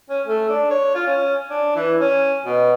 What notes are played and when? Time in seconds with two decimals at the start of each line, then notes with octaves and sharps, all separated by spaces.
0.09 C#4
0.26 A3
0.49 D4
0.70 C#5
0.95 F4
1.07 C#4
1.50 D4
1.76 E3
2.00 C#4
2.45 B2